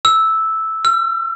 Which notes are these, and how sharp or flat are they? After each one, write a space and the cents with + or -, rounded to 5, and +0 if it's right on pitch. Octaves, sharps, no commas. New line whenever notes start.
E6 -5
E6 +45